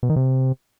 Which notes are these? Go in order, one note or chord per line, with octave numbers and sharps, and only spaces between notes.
B2
D#3
C3